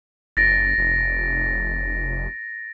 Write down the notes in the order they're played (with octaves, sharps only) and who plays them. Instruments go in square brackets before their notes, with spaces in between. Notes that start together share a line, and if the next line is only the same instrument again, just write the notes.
[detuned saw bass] F#1 [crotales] A6 A#6 D7
[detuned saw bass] F1